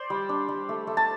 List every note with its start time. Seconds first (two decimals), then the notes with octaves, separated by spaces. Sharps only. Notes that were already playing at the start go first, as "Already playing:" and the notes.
Already playing: C5 D5
0.10 G3
0.29 D4
0.48 G3
0.69 A3
0.87 A3
0.97 A5